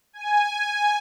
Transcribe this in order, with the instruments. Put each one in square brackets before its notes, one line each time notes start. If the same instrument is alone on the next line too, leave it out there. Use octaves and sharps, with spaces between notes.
[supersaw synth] G#5